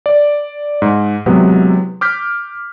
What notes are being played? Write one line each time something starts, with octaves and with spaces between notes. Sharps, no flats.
D5
G#2
C3 E3 F#3 G#3 B3
D6 F6 G6 B6